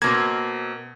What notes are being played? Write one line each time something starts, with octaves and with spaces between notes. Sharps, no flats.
B2 A#3 C4 G#6